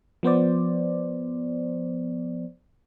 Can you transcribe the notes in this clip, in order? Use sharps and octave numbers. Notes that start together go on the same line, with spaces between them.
F3 B3 C5 D5